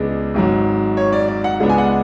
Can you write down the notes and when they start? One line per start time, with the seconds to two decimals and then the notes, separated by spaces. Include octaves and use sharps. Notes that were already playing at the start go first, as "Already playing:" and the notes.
Already playing: C#2 C#3 G#3 B3 D4
0.34 G#1 G#2 F#3
0.97 C#5
1.13 D5
1.28 D5
1.44 F#5
1.60 C#2 C#3 G#3 B3 D4 F#5
1.69 G#5
1.78 F#5